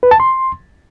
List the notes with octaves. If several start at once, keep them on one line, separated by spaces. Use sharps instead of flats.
B4
A5
C6